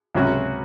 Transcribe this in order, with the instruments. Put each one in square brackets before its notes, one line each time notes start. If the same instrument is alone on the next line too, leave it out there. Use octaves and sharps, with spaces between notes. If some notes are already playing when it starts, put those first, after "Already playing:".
[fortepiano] C#2 C3 F#3 C#4 F#4